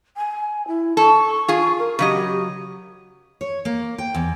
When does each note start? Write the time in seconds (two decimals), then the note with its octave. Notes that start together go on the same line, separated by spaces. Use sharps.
0.16 G#5
0.67 E4
0.97 A4 C#6
1.48 F4 G#4
1.78 A#4
1.99 C#3 F#3 G4 D#5
3.41 C#5
3.65 A#3
3.98 G5
4.14 E2